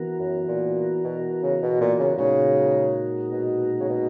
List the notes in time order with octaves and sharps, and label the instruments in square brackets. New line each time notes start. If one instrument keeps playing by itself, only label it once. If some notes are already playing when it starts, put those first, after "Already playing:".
Already playing: [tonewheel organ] E3 B3 F#4 A#4
[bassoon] F#2
A#2
B2
C#3
B2
A#2
C#3
[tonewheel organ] A#2 G#3 D#4 F#4 A#4 [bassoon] C#3
[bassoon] B2
C#3
B2